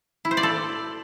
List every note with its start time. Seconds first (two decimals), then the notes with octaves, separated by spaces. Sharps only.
0.25 E4
0.31 C5
0.37 D5
0.43 A4